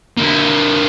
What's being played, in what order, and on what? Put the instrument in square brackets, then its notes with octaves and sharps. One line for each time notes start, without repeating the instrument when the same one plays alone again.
[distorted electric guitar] D3 A#3